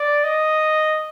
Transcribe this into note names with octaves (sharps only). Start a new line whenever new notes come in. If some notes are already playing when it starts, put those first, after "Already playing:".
Already playing: D5
D#5